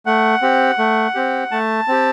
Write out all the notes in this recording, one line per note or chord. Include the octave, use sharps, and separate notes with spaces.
A3 F#5
C4 G4
A3
C4 G4
A3 A5
C4 G4